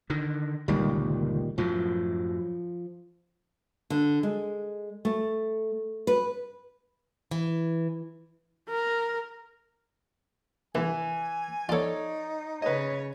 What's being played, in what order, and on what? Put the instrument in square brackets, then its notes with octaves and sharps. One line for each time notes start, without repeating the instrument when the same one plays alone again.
[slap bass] D3 D#3
[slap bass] G1 C#2 [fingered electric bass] A#2 D#3 G3
[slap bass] F#2 A2 F#3 [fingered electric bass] F3
[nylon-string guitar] D3
G#3
A3
B4
[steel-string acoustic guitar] E3
[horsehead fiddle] A#4
[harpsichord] C2 [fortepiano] E3 [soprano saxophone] G#5
[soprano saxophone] D#4 [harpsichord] F4 A4 [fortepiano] C#5 D5
[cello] C#3 C#5 [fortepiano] B4 D#5